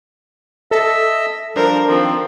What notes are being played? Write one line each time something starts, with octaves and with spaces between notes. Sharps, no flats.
A4 D#5 E5 E6
F3 G3 D4 A#4 C5
D#3 F3 C4